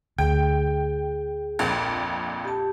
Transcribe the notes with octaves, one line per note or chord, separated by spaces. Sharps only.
D2 G#4 G5
A#1 F2 A#2
G4 A5